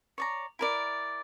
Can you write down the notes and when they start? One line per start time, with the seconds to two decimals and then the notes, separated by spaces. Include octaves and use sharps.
0.18 C#5 D5 A#5
0.59 E4 A#4 D5